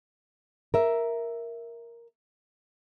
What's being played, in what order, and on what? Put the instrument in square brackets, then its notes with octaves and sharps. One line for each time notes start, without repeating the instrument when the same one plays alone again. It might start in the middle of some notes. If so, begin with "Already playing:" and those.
[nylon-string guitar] A#4 E5